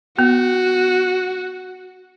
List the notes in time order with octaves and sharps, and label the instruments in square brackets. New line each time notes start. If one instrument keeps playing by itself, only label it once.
[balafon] B3 [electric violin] F#4